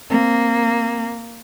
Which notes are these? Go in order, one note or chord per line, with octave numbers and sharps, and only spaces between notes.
A#3 C4